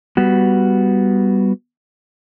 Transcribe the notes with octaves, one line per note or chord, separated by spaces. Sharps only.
G3 B3 F#4